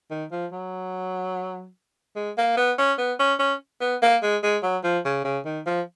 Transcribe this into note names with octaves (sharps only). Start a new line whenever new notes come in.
D#3
F3
F#3
G#3
A#3
B3
C#4
B3
C#4
C#4
B3
A#3
G#3
G#3
F#3
F3
C#3
C#3
D#3
F3